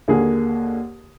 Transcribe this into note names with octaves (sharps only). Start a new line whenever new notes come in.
D#2 D3 A#3 G#4